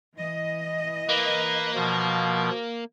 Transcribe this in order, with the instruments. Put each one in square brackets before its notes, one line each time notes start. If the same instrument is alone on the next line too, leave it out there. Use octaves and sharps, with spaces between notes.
[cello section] E3 D#5
[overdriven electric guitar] A#3 [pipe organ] B4
[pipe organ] B2 F3